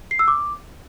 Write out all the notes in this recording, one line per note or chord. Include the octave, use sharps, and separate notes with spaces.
C7
E6
D6